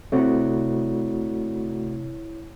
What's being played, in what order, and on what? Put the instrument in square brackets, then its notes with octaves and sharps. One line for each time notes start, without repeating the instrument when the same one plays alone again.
[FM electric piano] C3 [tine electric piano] A3 F#4 [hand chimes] E4 C#5